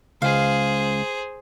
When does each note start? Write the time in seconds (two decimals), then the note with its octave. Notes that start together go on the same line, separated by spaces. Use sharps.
0.22 C#2 G#4 C5 F5